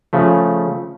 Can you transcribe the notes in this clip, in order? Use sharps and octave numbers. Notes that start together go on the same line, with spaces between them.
C#3 F3 A3